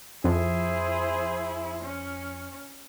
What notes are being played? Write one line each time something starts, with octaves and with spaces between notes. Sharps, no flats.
F2 E4 G#4 C5
C#4